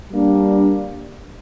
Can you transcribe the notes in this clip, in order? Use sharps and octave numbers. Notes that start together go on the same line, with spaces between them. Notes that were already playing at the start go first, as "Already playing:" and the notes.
G3 A#3 D4